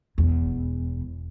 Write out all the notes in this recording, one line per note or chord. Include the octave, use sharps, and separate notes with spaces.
E1 E2